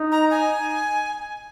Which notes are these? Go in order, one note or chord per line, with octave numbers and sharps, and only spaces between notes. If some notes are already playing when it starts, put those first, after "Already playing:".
Already playing: D#4
A#5
G#5